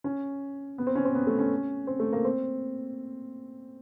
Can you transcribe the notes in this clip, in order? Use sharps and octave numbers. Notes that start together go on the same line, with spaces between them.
C#4
B3
C4
C#4
C4
B3
A3
C#4
C4
A3
A#3
C4